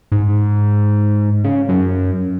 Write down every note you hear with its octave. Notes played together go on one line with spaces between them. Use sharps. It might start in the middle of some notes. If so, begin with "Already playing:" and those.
G#2
C#3
F#2